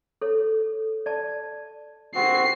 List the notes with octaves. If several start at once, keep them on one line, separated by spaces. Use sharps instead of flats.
A4 C#5
D5 A5
C4 F#4 C7